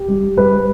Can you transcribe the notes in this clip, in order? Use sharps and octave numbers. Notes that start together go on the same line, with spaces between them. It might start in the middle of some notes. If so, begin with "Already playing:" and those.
Already playing: G4
G3
G3 B4